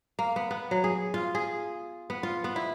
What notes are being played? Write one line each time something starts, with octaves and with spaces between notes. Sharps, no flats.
A#3
B3
B3
F#3
G#4
F4
G#4
B3
F4
B3
E4